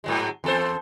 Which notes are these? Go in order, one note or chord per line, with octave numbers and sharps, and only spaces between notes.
G#2 F#3 G#3
E2 A4 C5